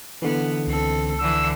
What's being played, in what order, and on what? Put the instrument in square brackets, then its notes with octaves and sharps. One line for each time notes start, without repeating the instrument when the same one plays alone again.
[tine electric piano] D3 E3 [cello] B3
[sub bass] C#2 [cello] C4 A4
[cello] D3 E3 [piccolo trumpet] E6